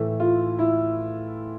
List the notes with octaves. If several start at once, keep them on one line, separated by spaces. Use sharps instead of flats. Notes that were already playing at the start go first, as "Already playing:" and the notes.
Already playing: A2 E3 A3
F4
E4